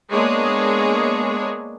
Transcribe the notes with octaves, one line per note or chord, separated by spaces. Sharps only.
G#3 A#3 B3 D4 G#4 C#5